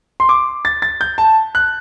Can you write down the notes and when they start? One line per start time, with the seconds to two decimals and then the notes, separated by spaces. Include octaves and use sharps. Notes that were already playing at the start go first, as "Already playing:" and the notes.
0.20 C6
0.29 D6
0.65 A6
0.82 A6
1.01 G6
1.18 A5
1.55 F#6